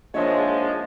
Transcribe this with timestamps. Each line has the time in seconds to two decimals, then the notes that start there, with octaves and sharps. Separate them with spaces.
0.14 A#1 G#2 F3 G#3 C#5 D#5 E5 A5